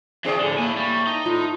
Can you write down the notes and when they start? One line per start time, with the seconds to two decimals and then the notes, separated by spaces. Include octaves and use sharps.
0.25 E3 F3 C4 G#4 D5
0.41 A2 D3 G#5
0.59 A#3 E4 G#5
0.76 G3 C#6
1.07 D#4 A#6
1.26 A2 F4